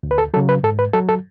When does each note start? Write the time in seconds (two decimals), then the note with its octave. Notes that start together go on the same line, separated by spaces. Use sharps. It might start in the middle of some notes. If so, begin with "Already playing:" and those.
0.03 D2
0.11 B4
0.18 A4
0.34 F#3 A4
0.37 C#3
0.49 B4
0.63 G#2 A4
0.79 B4
0.94 F#3 A4
1.09 A4